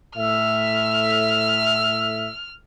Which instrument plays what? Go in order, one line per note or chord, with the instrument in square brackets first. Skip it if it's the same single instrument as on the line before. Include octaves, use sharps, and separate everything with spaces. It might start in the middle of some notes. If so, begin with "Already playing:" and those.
[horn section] A2 E5 [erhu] F6